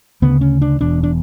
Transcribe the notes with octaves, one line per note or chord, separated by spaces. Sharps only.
D2 C#3 B3
C#4
D4
E1 E2 B2 D4
D4